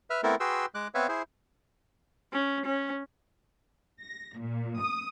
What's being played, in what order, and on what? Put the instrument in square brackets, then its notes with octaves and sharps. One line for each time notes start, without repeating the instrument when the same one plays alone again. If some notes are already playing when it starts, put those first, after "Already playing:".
[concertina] B4 E5 F6
A3 B3 C4 E4 A4 A#4
F#4 G#4 B4 G5 C6 E6
G#3 D6 F#6
B3 C4 B4 C#5 E5 F5
E4 G#4 C5
[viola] C#4
C#4
[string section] A#6
A#2
D#6